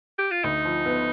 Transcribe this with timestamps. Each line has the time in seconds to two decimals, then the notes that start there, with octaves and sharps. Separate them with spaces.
0.18 G4
0.31 F4
0.44 D2 D#4
0.65 F3
0.86 B3